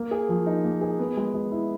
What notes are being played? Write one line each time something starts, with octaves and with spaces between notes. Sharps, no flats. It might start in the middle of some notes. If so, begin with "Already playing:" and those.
Already playing: A#3
G#4
F3
D#4
A#3
G#4
B3
G#3
G#3
E4